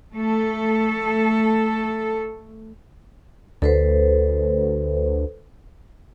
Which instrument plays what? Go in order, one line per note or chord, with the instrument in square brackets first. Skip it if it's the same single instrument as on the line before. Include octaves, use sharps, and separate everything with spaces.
[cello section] A3 A4
[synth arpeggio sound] D2 [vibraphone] A4 B4 C5